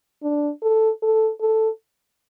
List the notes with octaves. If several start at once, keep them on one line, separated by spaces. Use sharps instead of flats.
D4
A4
A4
A4